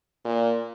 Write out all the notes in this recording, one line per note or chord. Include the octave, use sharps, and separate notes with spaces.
A#2